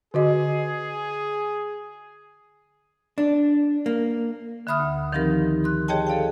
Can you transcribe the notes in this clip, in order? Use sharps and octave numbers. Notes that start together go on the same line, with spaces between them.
D3 F#4 G#4 D#5
D4
A#3
D3 E5 B5 D#6 F6
D2
D#3 F3 C4 D#4 G4 A#4
C6 F#6
G4 G#4 C#5 D#5 G5 A5
A4 D5 F5 G5